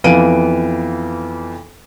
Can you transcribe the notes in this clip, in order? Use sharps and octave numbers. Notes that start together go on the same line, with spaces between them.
F2 E3 B3 F5 D7 D#7